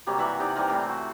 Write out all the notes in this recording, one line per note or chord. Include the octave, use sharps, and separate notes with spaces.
C3 F#3 G3 A#3
E3 E5 F#5 A#5
C3 D#4 D5
E3 G3 C4 A#4
A2
F#4